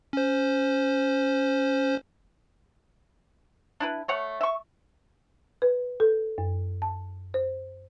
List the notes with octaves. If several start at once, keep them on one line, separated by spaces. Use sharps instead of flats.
C#4 C5
D4 E4 B4
A3 C#5 F#5
E5 C#6
B4
A4
F#2
A5
C5